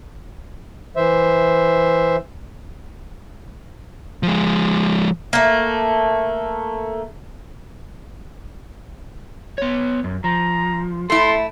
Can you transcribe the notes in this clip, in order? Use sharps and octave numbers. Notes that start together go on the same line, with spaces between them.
E3 C5 E5
F3 G#3
A3 A#3
B3 C#5
F#2
F3 A#5
A3 E4 A4 C6